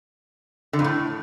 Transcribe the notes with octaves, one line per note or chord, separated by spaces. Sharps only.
D3
F2
A2